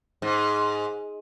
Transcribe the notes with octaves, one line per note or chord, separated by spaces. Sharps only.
G#2